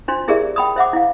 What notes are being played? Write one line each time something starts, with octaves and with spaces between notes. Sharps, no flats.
D4 F4 C5 C6
E4 G4 G#4 A#4 D5 E5
G5 B5 D#6
C5 E5 F#5 D6
E4 F5